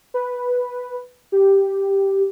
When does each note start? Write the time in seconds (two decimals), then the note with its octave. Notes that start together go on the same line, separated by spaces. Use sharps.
0.14 B4
1.32 G4